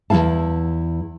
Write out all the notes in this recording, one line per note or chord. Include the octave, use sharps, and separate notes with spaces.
E2 F#3 E4 F5 A5